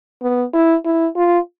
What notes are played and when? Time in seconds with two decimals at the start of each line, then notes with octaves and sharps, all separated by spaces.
0.22 B3
0.54 E4
0.85 E4
1.16 F4